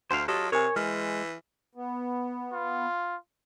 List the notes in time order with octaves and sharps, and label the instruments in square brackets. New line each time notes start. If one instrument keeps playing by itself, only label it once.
[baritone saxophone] D2 [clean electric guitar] C5 F5
[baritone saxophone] F#3 [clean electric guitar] F4 A4 D#5 [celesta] G4
[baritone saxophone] C3 [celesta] A#4 G#5 [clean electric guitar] C#5
[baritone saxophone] E3 [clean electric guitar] G#3 [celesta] F6
[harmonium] B3
[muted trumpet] F4